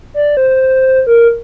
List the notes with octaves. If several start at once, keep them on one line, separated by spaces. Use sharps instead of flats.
D5
C5
A#4